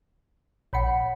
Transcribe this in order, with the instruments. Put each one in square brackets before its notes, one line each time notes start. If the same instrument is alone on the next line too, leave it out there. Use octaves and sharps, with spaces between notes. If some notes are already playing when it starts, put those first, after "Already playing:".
[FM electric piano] A#1 B5 C#7 [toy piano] C#5 F#5